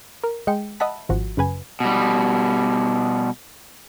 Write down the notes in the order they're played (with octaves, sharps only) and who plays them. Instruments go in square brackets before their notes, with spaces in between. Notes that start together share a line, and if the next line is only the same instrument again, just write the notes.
[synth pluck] A#4
G#3 G5 C#7
D#5 E5 F#5 A5 B5
G#1 F3 F#4
F#2 C#3 B4 G#5
[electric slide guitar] B2 G3